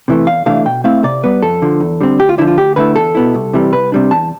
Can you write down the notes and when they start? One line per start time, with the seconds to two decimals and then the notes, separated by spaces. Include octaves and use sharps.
0.08 C3 E3 A3
0.27 E2 F5
0.46 C3 E3 A3 D4 F5
0.65 B2 G5
0.84 A3 C4 E4 F5
1.04 C3 D5
1.24 G3 B3 B4
1.43 F2 A4
1.62 D3 F3
1.80 E2
2.01 D3 G3 C4
2.19 D2 G4
2.29 F4
2.38 D3 F3 E4
2.47 F4
2.57 D2 G4
2.76 D3 A3 E4 B4
2.96 E2 A4
3.15 B2 B3 E4
3.35 C2
3.54 C3 E3 G3
3.73 C2 B4
3.92 C3 G3 D4
4.11 E2 A5